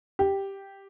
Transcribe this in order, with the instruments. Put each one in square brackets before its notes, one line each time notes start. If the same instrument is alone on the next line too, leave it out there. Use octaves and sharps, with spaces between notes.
[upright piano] G4